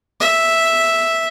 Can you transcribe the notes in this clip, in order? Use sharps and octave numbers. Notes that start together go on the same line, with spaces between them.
E5